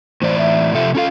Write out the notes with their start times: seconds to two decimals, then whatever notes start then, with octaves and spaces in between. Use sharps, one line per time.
0.22 A2 E3 C5 D5
0.38 E5
0.74 C3 F3 A4 E5
0.95 C#4 F4 A4 F5